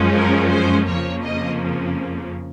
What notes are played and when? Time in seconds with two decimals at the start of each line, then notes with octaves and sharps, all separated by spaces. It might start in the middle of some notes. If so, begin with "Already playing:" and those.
Already playing: F#2 F3 G#3 C#4
0.15 A#4
0.51 C5
0.87 F2 C#3 F3 A#3 C#5
1.23 D#5